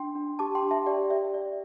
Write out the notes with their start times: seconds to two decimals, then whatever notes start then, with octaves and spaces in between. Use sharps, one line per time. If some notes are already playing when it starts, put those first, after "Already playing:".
Already playing: D4 G5 C6
0.15 D4
0.39 G4 A5 D6
0.55 G5 C6
0.63 D4
0.71 E5 A5
0.86 G4 D5 G5
1.10 D5 E5
1.34 D5